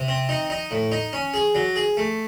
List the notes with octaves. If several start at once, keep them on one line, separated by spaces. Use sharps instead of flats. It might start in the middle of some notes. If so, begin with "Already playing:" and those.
Already playing: C3
C4
D#4
D#4
A2
D#4
C#4
G#4
F#3
G#4
A3